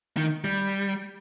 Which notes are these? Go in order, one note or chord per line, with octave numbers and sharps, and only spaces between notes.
D#3
G3